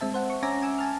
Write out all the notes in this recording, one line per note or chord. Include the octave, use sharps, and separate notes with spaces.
G#3 C4 E5 A5
C5 F#5
C#6
C#4 E5 G#5 A#5 D6 A#6
G#5 D6 E6
G#5 A5 F6